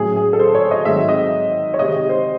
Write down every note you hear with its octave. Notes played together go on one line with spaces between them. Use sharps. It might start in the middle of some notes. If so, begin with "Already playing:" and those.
Already playing: A2 F#3 C#4 G#4
G#4
A4
C5
C#5
D#5
G#2 D#3 F#3 C4 E5
D#5
C#5
C3 D#3 G#3 D#5
C5